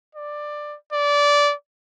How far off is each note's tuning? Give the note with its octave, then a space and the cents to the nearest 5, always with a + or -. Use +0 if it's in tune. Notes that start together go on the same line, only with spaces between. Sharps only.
D5 +15
D5 -20